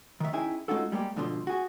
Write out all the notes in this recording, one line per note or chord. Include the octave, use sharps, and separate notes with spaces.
D#3 E5
C#4 D#4 E4 G#4 G5 G#5
G#3 C#4 D#4 F4 F#4 A4
G3 G#3 A#3 G4
G#2 B2 D3 F3 B4 C5
F#4 G#4